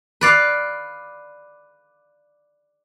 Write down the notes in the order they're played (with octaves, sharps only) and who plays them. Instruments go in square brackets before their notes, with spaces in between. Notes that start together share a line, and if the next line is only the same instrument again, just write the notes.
[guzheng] B4 D5 F5